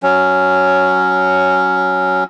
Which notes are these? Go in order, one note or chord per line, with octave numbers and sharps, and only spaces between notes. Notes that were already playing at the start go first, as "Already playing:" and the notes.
F#3 C#4